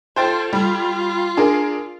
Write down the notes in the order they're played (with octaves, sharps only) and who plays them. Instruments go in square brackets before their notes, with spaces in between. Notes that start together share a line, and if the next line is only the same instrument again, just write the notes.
[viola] F4 A4 [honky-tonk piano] C5 G5 A6
[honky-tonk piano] G3 [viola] F4
[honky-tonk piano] D4 G#4 A#4